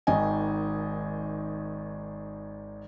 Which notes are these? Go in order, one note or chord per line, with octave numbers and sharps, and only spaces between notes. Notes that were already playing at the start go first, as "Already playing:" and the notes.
G#1 D#3 D#5 G#5